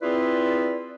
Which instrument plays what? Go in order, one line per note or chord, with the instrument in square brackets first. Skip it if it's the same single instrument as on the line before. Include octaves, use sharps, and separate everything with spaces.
[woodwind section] C4 E4 F4 G#4 B4 D5